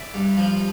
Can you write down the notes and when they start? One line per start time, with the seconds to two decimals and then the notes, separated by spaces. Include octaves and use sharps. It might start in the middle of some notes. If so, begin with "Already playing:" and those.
Already playing: D5 E5
0.14 G2
0.37 F3